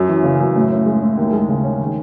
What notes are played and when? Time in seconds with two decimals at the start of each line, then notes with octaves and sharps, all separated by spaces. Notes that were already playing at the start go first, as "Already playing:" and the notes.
Already playing: F#2 C#4
0.09 E3
0.24 C#3
0.40 F#2
0.56 A2
0.71 C#4
0.86 G#3
1.02 A2
1.17 D#2
1.33 G#3
1.48 C#3
1.64 C#4
1.80 D#3